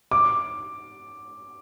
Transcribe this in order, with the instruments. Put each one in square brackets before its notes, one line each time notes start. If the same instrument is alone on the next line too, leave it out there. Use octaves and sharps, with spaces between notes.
[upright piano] D6